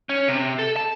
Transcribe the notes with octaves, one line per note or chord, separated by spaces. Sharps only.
C#4
C3
A4
A5